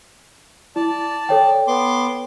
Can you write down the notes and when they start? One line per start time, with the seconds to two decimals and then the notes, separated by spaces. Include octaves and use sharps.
0.76 E4 D5 A5
1.29 A4 C#5 G5
1.67 B3 C6 D6